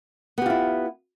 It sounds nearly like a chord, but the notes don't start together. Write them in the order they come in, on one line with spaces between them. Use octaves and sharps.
B3 G4 F4 E4